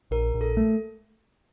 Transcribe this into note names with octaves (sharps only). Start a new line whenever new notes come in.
A#1 A#4
A#1
A4
A3